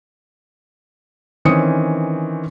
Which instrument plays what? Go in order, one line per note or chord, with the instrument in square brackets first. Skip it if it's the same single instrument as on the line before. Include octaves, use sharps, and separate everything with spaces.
[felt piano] D#3 E3 C4 C#4 D#6 C#7